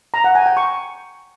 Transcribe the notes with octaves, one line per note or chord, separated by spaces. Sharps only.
A#5
F#5
G#5
G5
C#6